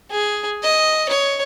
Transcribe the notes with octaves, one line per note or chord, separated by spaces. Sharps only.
G#4
D#5
C#5